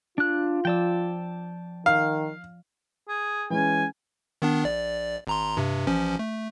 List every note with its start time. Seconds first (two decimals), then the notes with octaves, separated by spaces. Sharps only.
0.18 D4 F4 F#6
0.65 F3 D5 G5 A5 E6
1.86 D#3 F5
3.08 G#4
3.50 E3 G#3 C#4 G#5
4.42 D#3 B3 D4
4.64 A#1 D5
5.27 G#1 A#5 C6
5.57 G2 C3
5.87 A1 F3 C#4
6.19 A3